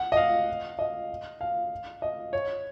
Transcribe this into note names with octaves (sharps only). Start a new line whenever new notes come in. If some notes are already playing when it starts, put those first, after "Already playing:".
Already playing: F#5
D#5
F5
D#5
F5
D#5
C#5